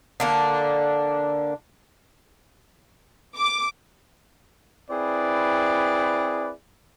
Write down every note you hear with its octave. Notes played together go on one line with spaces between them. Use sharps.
D3 A#3 D4
D6
C4 E4 G#4 B4 D5